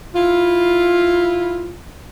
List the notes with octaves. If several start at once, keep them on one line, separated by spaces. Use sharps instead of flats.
E4 F4